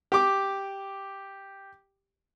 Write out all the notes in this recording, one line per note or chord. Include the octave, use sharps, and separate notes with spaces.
G4 D6